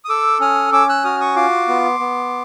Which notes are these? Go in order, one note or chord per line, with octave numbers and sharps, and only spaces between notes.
D#6
A4 D6 E6
C#4 D#6 F6
C#4 D6 E6
E6 F#6
F#4 D#6 F6
C#6 D#6
F4 C6 D6
B3
B3